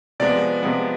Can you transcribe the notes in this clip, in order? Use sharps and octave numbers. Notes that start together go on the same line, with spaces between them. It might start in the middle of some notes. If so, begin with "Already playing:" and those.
C3 F3 G#3 B3 D5
C3 F3 G#3 B3